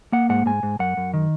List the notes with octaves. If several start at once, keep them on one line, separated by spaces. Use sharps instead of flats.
A#3 F#5
G#2 F#5
G#2 G#5
G#2
F#2 F#5
F#2
D#3